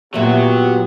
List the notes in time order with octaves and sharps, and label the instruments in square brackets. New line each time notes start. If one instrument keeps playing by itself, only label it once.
[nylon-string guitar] A#2 E5 [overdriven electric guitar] F#3 F#4 [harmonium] B3 [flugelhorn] G4